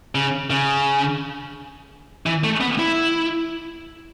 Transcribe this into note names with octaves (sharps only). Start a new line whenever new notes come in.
C#3
C#3
E3
A3
B3
E4